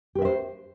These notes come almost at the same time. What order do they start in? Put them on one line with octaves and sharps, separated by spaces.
G4 B4 E5 C5